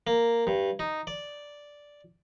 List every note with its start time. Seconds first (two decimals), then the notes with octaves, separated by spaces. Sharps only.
0.07 A#3
0.47 G2
0.79 D#4
1.07 D5